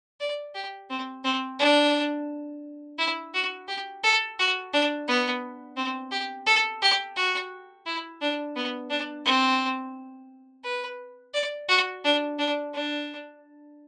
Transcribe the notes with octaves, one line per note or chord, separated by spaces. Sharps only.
D5
G4
C4
C4
D4
E4
F#4
G4
A4
F#4
D4
B3
C4
G4
A4
G4
F#4
E4
D4
B3
D4
C4
B4
D5
F#4
D4
D4
D4